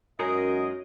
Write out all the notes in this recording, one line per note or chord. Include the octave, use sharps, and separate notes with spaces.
F#2 G#3 D#4 F#4 G#4 A#4 C#5 D#5